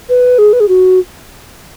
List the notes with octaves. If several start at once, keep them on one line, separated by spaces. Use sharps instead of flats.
B4
G#4
B4
G#4
F#4